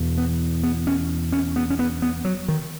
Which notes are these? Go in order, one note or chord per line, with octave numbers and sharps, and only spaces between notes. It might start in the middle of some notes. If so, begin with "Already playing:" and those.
Already playing: E2 B2
B3
B3
C#4
C#4
B3
C#4
B3
B3
F#3
D#3